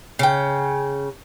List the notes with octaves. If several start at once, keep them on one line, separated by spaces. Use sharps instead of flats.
C#3 G5